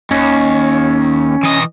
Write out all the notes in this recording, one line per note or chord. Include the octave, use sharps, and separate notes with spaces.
D#2 C#4
E3 D#5